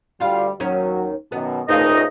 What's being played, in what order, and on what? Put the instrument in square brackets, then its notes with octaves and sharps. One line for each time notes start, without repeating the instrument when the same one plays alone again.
[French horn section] D2 G3 [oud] F4 F5
[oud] D#2 D#3 C#4 [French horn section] F#3
[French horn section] F#2 B2 D#3 [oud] B3
[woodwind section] C#2 D#4 D#5 [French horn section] A#2 A3 [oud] C4 F4